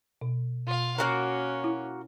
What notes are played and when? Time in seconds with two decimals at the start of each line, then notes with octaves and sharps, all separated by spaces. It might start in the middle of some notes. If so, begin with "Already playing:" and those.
0.21 B2
0.67 B2 F4 F5
0.98 A#3 C#4 F#4 A#4
1.64 E4